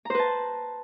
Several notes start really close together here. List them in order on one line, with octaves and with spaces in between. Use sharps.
A#5 C5 B4 A5